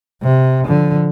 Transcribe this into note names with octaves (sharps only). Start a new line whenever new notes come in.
C3
D3 F3